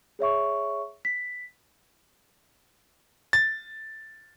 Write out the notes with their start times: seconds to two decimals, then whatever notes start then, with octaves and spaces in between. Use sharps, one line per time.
0.19 G#4 C#5 E5 C#6
1.05 B6
3.33 A6